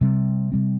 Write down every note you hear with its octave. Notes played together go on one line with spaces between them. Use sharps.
C3 G3 C4
C3 G3 C4